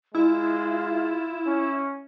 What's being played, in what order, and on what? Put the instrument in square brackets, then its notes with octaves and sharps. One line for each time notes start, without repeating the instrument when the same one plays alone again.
[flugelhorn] G#3 [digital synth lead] E4 [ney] F4
[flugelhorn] C#4